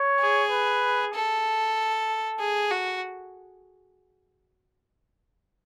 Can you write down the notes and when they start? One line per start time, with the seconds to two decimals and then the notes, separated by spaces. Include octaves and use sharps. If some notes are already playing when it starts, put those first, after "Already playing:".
Already playing: C#5
0.20 G#4
0.51 B4
1.14 A4
2.39 G#4
2.71 F#4